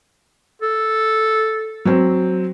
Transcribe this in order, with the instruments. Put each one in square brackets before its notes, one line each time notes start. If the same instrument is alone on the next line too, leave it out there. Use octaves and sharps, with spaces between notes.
[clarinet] A4
[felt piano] F#3 C4